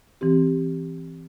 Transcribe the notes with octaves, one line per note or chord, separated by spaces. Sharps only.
E3 C4 G4